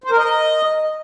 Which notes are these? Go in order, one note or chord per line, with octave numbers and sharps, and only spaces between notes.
C5
A#4
D#5